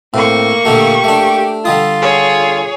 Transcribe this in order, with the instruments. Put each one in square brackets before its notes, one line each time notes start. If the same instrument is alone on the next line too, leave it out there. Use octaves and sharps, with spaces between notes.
[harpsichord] A2 [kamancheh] A#3 C#6 [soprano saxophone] C4
[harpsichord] A#2 D3 A3 [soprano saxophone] G4
[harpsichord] A3 D4
[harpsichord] D3 G3 D#6 [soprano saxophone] F4
[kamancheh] G#4 C#5